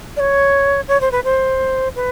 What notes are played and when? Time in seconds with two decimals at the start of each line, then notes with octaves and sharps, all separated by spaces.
0.16 D5
0.20 C#5
0.88 C#5
1.01 C5
1.12 B4
1.24 C5
1.96 B4